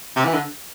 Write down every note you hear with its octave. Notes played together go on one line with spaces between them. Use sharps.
C3
E3
D3